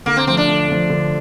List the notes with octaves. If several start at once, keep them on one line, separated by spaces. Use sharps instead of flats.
D3 A#3
C4
F3 A3 C4
D4
D3
F3 A3
D3